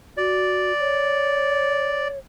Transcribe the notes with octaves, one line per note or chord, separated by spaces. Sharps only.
F#4 D5
C#5